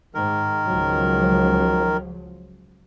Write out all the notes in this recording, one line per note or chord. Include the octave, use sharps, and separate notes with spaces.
G#2 D#3 A#4
C#2 F3 F#3